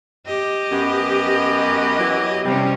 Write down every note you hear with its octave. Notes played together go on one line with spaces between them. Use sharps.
G4 D#5
F#2 B3
E3 F#3
C3 G3 C#4